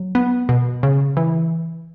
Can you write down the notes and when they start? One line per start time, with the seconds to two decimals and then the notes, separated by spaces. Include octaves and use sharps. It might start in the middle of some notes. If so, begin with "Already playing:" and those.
Already playing: F#3
0.15 B3
0.49 B2
0.83 C#3
1.17 E3